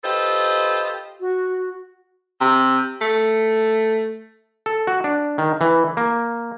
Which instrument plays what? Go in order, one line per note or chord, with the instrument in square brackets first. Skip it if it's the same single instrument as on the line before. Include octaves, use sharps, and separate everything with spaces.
[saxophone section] F4 G4 A4 B4 C5 D#5
[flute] F#4
[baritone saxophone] C3
A3
[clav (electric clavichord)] A4
F#4
D4
D#3
E3
A#3